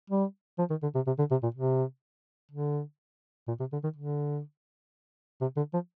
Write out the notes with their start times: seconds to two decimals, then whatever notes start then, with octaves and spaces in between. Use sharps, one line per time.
0.10 G3
0.59 F3
0.70 D#3
0.82 D3
0.95 C3
1.07 C3
1.19 D3
1.31 C3
1.43 A#2
1.55 C3
2.51 D3
3.48 A#2
3.60 C3
3.73 D3
3.84 D#3
3.96 D3
5.41 C3
5.57 D3
5.73 F3